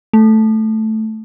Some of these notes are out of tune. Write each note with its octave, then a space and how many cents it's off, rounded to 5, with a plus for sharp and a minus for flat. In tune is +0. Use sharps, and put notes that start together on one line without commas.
A3 -5